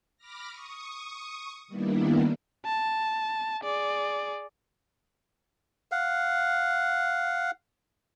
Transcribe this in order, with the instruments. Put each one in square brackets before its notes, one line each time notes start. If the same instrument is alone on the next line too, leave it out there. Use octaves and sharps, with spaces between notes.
[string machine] B5 D6 F6 A#6
C#6 D#6
D#3 G3 A#3 B3 D4 E4
[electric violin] A5
G#4 D5
[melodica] F5 F#5